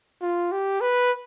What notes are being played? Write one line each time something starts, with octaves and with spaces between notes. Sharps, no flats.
F4
G4
B4